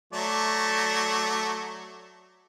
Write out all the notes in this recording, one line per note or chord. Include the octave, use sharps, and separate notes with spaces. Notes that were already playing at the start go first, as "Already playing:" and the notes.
F#3 A3 D5